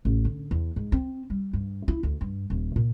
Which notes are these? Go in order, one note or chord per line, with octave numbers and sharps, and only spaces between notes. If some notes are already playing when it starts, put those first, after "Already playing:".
A1
D3
E2
G#2
C4
G3
G2
E4
D2
G2
D#1
A#2